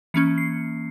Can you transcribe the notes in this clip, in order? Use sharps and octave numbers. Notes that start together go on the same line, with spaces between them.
E3 A#3 C#4 C#7
C7